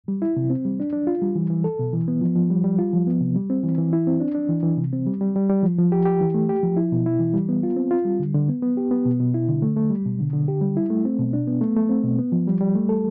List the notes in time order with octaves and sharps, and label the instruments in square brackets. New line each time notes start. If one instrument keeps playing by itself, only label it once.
[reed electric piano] G3
E4
C3
C4
G3
D4
D4
F4
G3
E3
E3
A4
B2
E3
B3
F3
F3
G3
G3
F4
F3
B3
C3
G3
C4
E3
E3
E4
C4
D4
D4
E3
E3
C3
C4
G3
G3
G3
G3
F3
F3
G4
G4
E3
A3
G4
F3
E4
B2
E4
E3
G3
B3
F4
C4
F4
G3
D3
D3
B3
B3
G4
B3
B2
B2
E4
D3
A3
A3
G3
B2
D3
D3
G4
G3
E4
A3
C4
B2
D4
B3
A3
A3
C4
B2
B3
F3
G3
G3
A3
A4